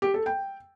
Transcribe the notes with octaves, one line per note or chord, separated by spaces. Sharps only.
G4
A4
G5